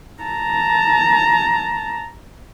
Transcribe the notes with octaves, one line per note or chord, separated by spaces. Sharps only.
A5 A#5